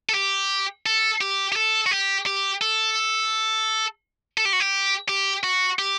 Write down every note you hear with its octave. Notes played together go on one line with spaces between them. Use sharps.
A4
G4
A4
G4
G4
A4
F#4
G4
G4
A4
A4
G4
F#4
G4
G4
F#4
G4